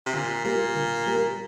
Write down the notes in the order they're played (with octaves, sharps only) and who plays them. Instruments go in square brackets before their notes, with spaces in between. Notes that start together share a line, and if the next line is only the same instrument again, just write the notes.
[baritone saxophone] C3
[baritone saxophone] A#2 [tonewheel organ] D3
[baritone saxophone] A#2 [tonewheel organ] G3 A#3 G4 A#4
[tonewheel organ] D3
G3 A#3 G4 A#4